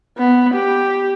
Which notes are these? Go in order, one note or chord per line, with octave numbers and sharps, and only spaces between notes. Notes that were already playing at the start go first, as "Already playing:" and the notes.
B3
G4